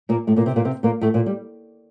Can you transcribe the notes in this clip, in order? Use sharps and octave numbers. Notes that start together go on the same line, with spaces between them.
A#2 A#3
A2 A3
A#2 A#3
C3 C4
A#2 A#3
C3 C4
A#2 A#3
A2 A3
A#2 A#3
G3